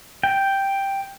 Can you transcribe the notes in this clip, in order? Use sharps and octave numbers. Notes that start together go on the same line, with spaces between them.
G5